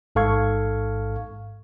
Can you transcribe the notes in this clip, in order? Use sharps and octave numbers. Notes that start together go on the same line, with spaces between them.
A1 G#2 A4 F5 C#6 G#6